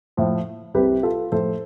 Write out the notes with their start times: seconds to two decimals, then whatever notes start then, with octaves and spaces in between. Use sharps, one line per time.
0.17 A2 F3
0.74 C2 C3 G3 G4 B4
1.03 F4 A4
1.32 A2 F3 A4 C5